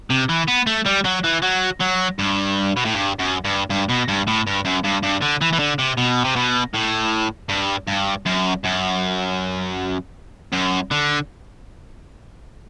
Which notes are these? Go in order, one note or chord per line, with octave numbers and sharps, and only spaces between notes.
C3
E3
B3
A3
G3
F#3
E3
F#3
F#3
G2
B2
A2
G2
F#2
G2
G2
B2
G2
A2
G2
F#2
G2
G2
D3
E3
E3
D3
C3
B2
C3
B2
A2
G2
G2
F#2
F#2
F#2
D3